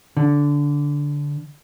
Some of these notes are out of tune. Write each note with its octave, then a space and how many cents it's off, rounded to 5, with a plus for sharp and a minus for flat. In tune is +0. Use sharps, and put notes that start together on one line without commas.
D3 -15